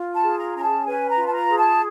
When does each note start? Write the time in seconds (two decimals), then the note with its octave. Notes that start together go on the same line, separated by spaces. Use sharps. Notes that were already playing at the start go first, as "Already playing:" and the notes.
Already playing: F4
0.14 A5
0.23 G#4
0.38 A#5
0.55 C#4 A#5
0.63 A5
0.86 B4 G#5
1.09 A#5
1.17 F4
1.26 A5
1.33 A#5
1.49 G#4
1.57 A5